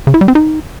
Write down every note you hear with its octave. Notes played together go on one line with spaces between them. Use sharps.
C#3
E4
G3
C4
D#4